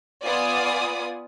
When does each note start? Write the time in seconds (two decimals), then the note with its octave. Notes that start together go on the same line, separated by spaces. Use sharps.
0.24 B3 F4 D5 G#5 D#6